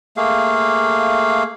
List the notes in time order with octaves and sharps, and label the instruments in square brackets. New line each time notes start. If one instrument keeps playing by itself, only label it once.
[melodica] A3 A#3 G#4 F5